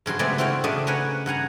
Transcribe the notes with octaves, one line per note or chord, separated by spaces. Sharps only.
G2 C#3 F#3 C6
C#3 G#3 A3 B3 C4 D5
C4 E4 F#4 F5 G5
C#3 A3 D4 D#5
C#4 A#4 B4 F#5 G#5
G2 F#5 G#5 A#5